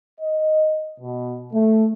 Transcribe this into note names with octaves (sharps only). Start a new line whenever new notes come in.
D#5
B2
A3